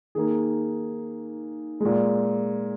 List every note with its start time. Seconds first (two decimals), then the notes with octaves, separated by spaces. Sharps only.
0.15 D#3 A#3 G#4
1.80 A#2 G#3